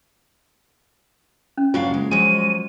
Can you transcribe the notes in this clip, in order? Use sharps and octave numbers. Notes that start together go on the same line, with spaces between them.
C#4
F#1 F#3 D4 F4 F5
G#3
F3 F#3 G#3 D#7